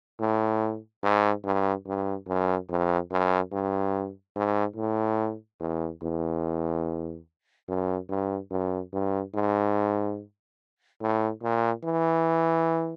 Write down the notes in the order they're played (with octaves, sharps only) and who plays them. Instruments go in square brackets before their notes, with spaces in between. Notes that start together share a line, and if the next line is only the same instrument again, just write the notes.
[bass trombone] A2
G#2
G2
G2
F#2
F2
F#2
G2
G#2
A2
E2
E2
F#2
G2
F#2
G2
G#2
A2
A#2
E3